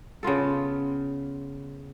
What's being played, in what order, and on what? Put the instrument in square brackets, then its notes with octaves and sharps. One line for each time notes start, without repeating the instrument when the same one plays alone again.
[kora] C#3 B3 F4 A4